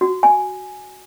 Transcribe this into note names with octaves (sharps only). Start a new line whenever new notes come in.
F#4
G#5